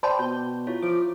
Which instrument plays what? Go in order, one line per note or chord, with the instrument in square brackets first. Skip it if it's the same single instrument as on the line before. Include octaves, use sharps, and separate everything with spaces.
[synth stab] C5 D5 G5 [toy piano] A5 B5 C6
[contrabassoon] B2 [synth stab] G6
[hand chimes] E4 F4 C#5
[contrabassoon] F3 [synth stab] D6